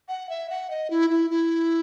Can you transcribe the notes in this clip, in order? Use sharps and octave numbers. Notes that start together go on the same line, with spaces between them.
F#5
E5
F#5
D#5
E4
E4
E4